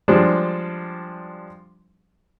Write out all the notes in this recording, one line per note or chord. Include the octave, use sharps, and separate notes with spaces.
F3 G3 G#3 D4